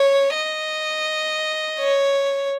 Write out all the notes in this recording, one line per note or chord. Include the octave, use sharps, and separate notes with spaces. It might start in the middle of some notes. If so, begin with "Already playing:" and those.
Already playing: C#5
D#5
C#5